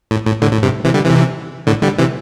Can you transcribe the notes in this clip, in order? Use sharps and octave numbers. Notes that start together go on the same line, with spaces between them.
A2
A2
A2 D3
A2
G2 C3
C3 E3
D3 G3
C3 E3
A2 D3
D3 G3
C3 E3